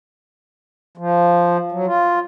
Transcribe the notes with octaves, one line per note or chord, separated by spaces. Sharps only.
F3
F#3
F4